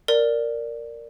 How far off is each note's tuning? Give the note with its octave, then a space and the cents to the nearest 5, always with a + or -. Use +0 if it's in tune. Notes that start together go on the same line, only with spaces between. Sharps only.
A#4 -5 D5 +0